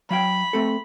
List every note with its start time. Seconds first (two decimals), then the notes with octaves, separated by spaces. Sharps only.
0.11 F#3 F5 G5 B5
0.53 A3 C4 A4